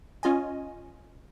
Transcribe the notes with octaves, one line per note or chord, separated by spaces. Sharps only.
C#4 F4 D#5 G#5